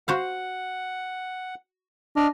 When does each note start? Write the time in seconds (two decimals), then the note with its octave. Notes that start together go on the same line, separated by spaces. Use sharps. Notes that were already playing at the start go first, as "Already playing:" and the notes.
0.08 F#4 C5 F5 F#5
2.16 D4 D#5 F6